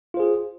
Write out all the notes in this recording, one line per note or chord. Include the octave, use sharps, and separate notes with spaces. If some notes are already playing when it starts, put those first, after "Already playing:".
F4 G#4 C5